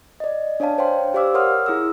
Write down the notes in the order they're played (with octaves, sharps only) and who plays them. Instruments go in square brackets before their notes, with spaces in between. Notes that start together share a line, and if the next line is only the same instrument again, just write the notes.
[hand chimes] D5 D#5
D4 C#5 D5 F5 A5
C5 C#5 F5 G5 C6
G4 C5 D5 F5 D6 E6
A#4 C#5 F#5 C6 D#6 F6
E4 G#4 D#6 E6